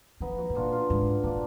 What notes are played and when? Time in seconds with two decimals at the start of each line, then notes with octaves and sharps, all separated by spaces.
0.20 F3 B3 D#4
0.38 D#4 F#4
0.50 G#2
0.55 A#2 D4 F4
0.72 D4 F4
0.90 G#2
1.23 A#2 A#3 D4